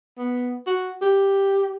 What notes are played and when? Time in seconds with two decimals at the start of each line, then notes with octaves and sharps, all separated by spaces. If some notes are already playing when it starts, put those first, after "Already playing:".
0.18 B3
0.67 F#4
1.02 G4